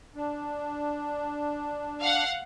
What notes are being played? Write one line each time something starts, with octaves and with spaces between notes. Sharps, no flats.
D4
F5 F#5